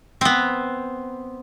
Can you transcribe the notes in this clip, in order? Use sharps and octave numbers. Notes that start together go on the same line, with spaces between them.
B3 C4